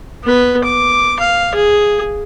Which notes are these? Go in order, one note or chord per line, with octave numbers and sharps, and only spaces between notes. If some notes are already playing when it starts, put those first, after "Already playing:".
B3 B4
D6
F5
G#4